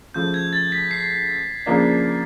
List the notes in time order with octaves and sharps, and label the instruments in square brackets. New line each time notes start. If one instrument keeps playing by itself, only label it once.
[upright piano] C#3 F3 A3 [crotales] G6
[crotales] G#6
A6
B6
C7
[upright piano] C#3 F3 A#3 D4